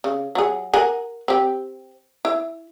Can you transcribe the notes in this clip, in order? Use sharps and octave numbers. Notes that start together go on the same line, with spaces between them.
C#3
F#3 G#4
A#4 F#5 G#5
C4 G4
E4